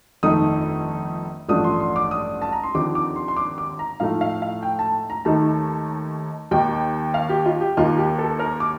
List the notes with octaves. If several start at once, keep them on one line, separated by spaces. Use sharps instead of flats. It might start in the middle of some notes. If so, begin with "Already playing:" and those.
G1 F2 D#3 A3 D#4 D#6
A1 G2 F3 A3 D4 D#6
C6
C6
D6
D#6
A5
A#5
C6
D#2 D3 F3 C4 D#4 D6
D6
C6
C6
D6
D6
A#5
A2 F3 A3 D#4 F5
F5
F5
G5
A5
A#5
D#2 D#3 A3 D#4 A5
D#2 D#3 A#3 G5
F5
G4
F4
G4
D#2 D#3 A#3 F4
G4
A4
A#4
D6